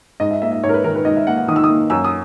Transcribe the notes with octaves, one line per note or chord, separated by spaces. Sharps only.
G#2 D#5
E5
A#3 E5
E5
G#2 C#5
A#4
B4
D#3 A#4
B4
G#2 D#5
E5
A#3 F#5
F#5
D#3 D#6
E6
D#6
A#3
F#2 E6
D#6